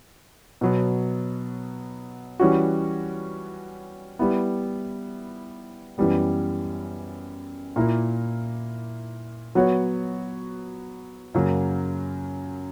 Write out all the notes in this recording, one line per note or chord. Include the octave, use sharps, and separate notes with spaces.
B2 F#3 B3
E3 G3 C#4 F#4
G3 B3 E4
F#2 E3 G3 B3
A#2 A#3 E4 A#4
F#3 B3 F#4 C#5
F#2 C#3 F#3 A#3